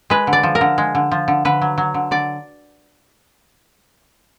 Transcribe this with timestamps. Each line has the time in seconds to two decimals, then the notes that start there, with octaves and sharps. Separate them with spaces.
0.10 G#3 B4
0.27 D3
0.33 D5
0.43 F3
0.55 A#4
0.61 D3
0.78 G#3
0.95 D3
1.12 F3
1.28 D3
1.45 D3 B4
1.62 F#3
1.78 F#3
1.94 D3
2.11 D3 D5